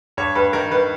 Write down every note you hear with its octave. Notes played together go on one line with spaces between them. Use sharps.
G2 C#5
G2 B4
D#3 A#4
D#3 B4